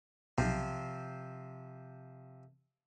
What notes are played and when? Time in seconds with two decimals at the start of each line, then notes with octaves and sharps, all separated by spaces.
0.38 B1 C3 F3 C4